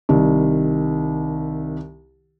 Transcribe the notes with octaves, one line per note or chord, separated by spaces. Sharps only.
C2 D#3